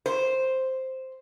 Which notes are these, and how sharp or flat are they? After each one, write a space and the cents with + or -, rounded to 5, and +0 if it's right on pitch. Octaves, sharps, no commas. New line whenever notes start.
C5 +0